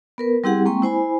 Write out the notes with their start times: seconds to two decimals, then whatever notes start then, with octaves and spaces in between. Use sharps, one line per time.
0.18 B3 A#4 B4
0.44 G3 C4 E4 G4 G#4 F#5
0.65 G#3 A#3 C4 G5 C#6
0.82 E4 C5 G#5 B5